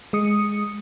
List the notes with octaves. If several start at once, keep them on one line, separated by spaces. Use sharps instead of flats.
G#3 D#6 C#7